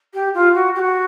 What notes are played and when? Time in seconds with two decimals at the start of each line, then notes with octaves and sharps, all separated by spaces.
0.14 G4
0.34 F4
0.55 F#4
0.75 G4
0.79 F#4